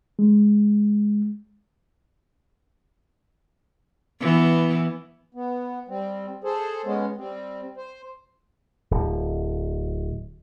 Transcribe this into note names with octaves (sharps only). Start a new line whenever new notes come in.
G#3
E3 B3
B3
G3 C4
G#4 A4 C5
G#3 B3 C#4
G3 C4
C5
D1